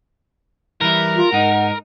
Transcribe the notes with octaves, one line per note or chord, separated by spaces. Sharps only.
E3 G3 E4 A#4
F4
G#2 D#4 F#5